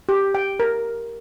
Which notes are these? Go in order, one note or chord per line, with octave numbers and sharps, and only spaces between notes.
G4
G5
A#4